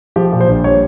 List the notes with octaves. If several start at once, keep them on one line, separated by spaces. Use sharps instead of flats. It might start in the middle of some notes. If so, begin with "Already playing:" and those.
F3 G4
A#2
C5
A#1
G3 C#5